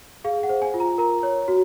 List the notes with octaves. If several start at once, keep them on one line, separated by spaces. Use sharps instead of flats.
G#4 F5
F#5
C5
G#5
F4
A#5
A#4 A#5
C#5
F#4